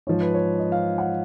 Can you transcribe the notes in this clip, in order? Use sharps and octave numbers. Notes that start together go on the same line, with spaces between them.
G#2 F3 C#5
B4
C#5
D#5
F5
F#5